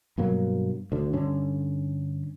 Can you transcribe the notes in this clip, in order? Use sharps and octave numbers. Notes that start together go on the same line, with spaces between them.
G2 B2 F#3 A#3
D2 D3
G2 D3 C#4